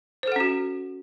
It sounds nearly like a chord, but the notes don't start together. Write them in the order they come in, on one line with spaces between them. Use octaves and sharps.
C5 A4 F#5 C#4 F#4